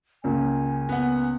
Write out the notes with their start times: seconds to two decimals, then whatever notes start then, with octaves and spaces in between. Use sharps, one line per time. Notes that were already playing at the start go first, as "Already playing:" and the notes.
0.24 C#2 C#3 A#3 G#5
0.89 B3 F#5